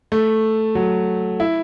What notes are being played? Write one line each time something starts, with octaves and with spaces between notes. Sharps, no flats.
A3
F#3
E4